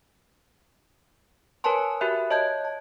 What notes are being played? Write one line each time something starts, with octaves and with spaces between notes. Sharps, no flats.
A#4 B4 C#5 G#5 A5 C6
F#4 G4 A#4 E5 B5 F#6
C#5 D#5 A5 G6 G#6
A5